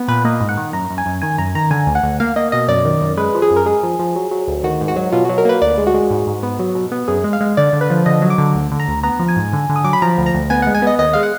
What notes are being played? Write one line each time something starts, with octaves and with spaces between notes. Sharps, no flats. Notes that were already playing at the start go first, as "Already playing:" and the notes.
Already playing: B3
A#2 B4
A#3 D#5
G#2
F#5
D#3
F#2 A#5
F#2
G#5
F#2
D#3 G#5
F#2 A#5
D#3 A#5
D3 G#5
D2
F#5
D2
A#3 F5
A#3 D#5
B2 D#5
F#2 D5
D#3
F#2
G#3 B4
F3
G#4
F#2
A#4
G#3 G#4
F3
F3
F#3
F#3
D2
D#3 F#4
G#2
F#4
F#3
B2 F4
F#3 F#4
A#4
A#3 B4
D2 D5
G#3
F#4
G#3
G#2
G#2
B3
F#3
B2
B3
F#2 G#4
G#3
F5
G#3
D3 D5
D3
B4
F3
D3 D#5
F#3
D6
D3
D2
D3
A#5
D2
B3 A#5
F3
G#5
G#2
D3
D3
D#6
F#3 D6
B5
F3 A#5
D2
A#5
D2
B3 G#5
G#3 F#5
G#5
B3 D#5
D#2 D#5
G#3 F5
F#5